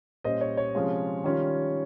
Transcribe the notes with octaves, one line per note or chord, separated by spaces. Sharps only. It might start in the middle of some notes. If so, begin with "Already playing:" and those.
A#2 G3 C#4 C5 D#5
C#5
C#5
C3 F3 G#3 C#4 F4
D#3 G3 C#4 F4